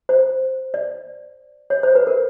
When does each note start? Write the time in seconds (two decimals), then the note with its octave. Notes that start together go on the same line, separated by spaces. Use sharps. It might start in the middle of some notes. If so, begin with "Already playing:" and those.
0.09 C5
0.74 D5
1.70 C#5
1.83 C5
1.95 B4
2.07 A#4